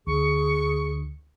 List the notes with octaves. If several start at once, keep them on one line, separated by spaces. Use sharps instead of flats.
D2 G#4 C#6